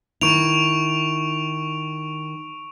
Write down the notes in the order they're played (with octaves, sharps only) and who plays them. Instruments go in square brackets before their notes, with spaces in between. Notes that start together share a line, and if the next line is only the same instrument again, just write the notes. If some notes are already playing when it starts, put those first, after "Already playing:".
[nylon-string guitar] D#3 E4 [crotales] C#6 D7 F7